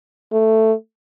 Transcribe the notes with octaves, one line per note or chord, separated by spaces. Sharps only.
A3